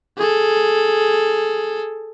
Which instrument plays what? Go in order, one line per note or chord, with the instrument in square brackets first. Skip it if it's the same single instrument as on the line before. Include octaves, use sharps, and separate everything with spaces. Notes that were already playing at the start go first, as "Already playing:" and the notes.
[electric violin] G#4 A4